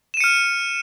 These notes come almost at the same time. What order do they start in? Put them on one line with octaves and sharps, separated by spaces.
E7 D#7 C#7 F6